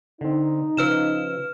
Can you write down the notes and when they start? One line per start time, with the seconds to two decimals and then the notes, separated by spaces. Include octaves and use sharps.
0.21 D3 C4 D#4
0.77 C#3 F3 B4 F6 E7